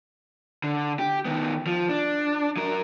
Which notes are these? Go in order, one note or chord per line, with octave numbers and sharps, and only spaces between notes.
D3
G4
D#3 B3
F3
D4
F#3 A#4